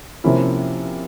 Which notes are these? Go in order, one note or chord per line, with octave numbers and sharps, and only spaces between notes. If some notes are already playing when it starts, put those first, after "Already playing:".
C3 F3 A#3 C#4 E4